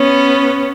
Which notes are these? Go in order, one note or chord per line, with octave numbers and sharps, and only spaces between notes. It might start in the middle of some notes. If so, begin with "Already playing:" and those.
Already playing: B3 C#4